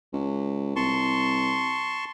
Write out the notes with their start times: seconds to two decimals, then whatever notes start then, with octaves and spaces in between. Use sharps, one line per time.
0.13 C#2
0.76 C2 A5 C6 C#6